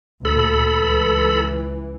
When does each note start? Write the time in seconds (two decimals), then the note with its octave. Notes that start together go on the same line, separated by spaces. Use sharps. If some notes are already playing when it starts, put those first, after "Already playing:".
0.25 D2 A#2 A4 B5
0.72 C#2 E3